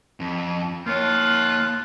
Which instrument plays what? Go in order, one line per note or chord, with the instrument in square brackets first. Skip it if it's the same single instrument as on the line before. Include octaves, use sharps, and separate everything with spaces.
[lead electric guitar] F2
[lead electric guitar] A#3 C#5 [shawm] F4 [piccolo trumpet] F#6